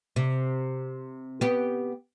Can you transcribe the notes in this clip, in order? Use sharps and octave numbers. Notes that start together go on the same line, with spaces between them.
C3
B3 G4